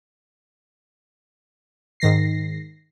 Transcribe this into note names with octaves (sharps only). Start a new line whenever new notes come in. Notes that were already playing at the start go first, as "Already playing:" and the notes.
G#2 D#3 A#6 C7